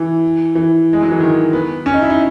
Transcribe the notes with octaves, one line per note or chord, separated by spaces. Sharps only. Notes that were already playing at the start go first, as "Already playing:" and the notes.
Already playing: E3
E3
G#3
F#3
E3
D#3
B3
C#4
D#4
E4
D#4